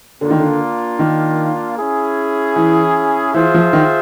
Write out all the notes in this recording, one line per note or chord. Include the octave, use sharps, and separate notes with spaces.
D3 A#3 D4 F4
D#3
D3
D#3
C#4 E4 G#4
E3
E3 F4 G#4 C5 E5
F3
D#3